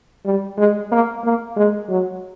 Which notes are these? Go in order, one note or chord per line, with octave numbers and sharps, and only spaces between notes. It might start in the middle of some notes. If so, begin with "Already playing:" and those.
G3
G#3
A#3
A#3
G#3
F#3